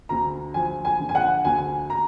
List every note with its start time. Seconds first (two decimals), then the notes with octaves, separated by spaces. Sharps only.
0.09 D2 A#5
0.54 F3 G#5
0.85 G#5
0.99 D3
1.09 G#5
1.15 F#5
1.45 D2 G#5
1.90 A#5